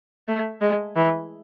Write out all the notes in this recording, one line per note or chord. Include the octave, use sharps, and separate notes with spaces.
A3
G#3
E3